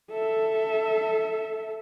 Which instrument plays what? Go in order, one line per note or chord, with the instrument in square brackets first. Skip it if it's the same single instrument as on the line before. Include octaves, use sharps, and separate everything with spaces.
[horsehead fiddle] A4 E5